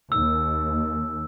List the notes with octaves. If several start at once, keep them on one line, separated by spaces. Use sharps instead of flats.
D#2 E6